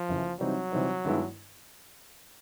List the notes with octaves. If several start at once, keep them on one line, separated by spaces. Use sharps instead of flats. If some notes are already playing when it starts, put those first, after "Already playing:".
Already playing: F3
F#1 F#2 C#3 E3
C3 E3 F#3 G3 C4 D#4
C3 E3 G3 C4 D#4
G2 D#3 G#3 B3 E4